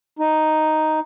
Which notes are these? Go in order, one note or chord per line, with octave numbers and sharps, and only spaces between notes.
D#4